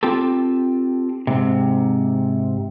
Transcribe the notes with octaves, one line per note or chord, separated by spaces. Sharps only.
C4 F4 G4 A4
G#2 C3